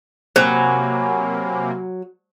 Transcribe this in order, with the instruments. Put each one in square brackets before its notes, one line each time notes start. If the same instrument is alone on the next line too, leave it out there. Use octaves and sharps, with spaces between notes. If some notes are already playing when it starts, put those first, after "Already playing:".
[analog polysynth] C3 A#3 [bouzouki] F#3 [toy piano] C5 [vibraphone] F#5 G#5 B5